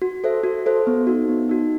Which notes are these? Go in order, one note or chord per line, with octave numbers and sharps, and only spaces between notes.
F#4
A4 C5 E5
F#4
A4 C5 E5
B3
D#4 F#4
B3
D#4 F#4